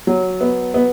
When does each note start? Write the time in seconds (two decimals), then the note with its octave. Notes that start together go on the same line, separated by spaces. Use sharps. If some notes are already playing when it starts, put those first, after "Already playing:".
0.07 F#3
0.41 B3
0.74 B3